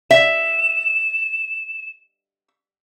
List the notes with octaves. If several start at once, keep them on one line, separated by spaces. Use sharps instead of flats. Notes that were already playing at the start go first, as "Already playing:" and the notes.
E5 E7